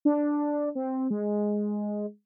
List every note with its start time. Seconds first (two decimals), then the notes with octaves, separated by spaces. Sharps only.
0.05 D4
0.75 C4
1.11 G#3